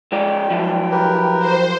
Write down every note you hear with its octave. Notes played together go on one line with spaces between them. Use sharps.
G#3 F4 D5 G5
F3 F#3 E4
G4 A#4 B4
C5